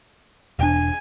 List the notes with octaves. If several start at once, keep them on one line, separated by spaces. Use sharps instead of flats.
E1 D4 G#5